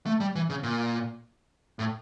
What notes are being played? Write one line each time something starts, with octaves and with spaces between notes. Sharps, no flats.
A3
G3
E3
C#3
A#2
A2